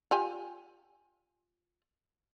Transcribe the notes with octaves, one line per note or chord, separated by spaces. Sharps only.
F4 G4 G#5